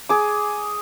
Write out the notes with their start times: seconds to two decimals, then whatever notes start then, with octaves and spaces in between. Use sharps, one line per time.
0.09 G#4 D6